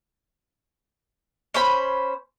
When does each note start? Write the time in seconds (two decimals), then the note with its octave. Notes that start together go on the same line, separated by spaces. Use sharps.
1.54 C#4 C5 B5